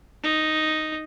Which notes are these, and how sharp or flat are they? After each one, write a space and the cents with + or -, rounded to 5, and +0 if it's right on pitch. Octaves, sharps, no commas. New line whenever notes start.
D#4 +0